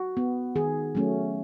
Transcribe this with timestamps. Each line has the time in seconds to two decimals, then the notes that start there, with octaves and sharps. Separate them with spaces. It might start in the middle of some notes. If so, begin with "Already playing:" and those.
Already playing: F#4
0.17 B3
0.55 D#3 G#4
0.95 F#3 A3 C#4